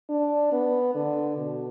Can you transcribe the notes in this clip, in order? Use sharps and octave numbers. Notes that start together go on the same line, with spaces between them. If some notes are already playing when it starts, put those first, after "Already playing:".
D4
B3
D3
B2